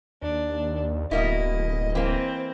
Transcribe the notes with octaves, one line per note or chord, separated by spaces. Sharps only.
D#2 D4
D1 B2 A#3 E4 D#5
E3 A#3 C4